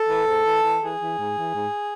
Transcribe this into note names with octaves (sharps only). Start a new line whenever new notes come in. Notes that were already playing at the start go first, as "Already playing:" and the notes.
Already playing: A4
E3
G#2
E3
E3
E3 G#4
E3
G#2
E3
G#2